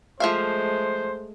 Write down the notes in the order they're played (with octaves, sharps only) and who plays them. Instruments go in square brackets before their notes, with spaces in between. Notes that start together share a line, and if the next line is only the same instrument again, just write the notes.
[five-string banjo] F3 E5 F5 [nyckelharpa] G#3 A3 [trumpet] C5